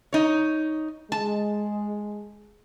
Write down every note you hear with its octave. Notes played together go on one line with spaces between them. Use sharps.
D#4 C#5
G#3 A5